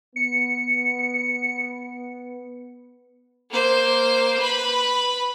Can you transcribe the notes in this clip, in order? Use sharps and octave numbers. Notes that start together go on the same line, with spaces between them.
B3 C#7
A#3 C5
B4 B5